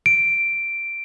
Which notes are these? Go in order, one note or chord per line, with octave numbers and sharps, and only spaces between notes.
D7